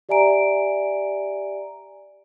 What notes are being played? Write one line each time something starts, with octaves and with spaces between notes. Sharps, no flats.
G4 D5 E5 G#5 A#5 D7